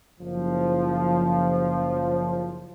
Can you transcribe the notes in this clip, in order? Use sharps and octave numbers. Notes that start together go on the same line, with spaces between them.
F#1 F3